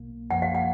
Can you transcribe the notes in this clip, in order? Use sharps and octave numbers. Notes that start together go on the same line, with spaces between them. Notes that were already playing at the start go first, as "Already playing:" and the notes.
Already playing: B1 B2 A#3
F#2 F3 A#3 F#5
F5
F#5